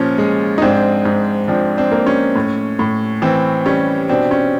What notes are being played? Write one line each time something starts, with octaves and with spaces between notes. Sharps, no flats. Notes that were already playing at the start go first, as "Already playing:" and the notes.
Already playing: A#2 F3 C#4
G#3
D#4
G#2 C4 D4
G#2
F3 C4 D4
C4 D4
A#3
C#4
A2
A2
E3 C4
G3 C#4
B2 C4 D4
C#4